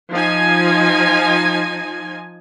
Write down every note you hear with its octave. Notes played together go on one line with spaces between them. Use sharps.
F3 D#4 G#5